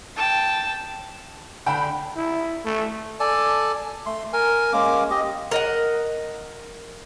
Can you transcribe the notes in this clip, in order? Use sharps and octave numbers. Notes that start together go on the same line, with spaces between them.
G5 A5
D3 F#5 G5 A5 B5
E4
A3
A4 D5 G#5 A5
A3 C6
A#4 G#5
G#3 A#3 C#4 D6
G4 D#5
A#4 D#5 F#5